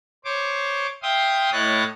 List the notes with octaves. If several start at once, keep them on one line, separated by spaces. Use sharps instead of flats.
C5 C#5 D6
E5 F5 G5 C6 D#6
A2 E4 C#5 D#5 F#6 A6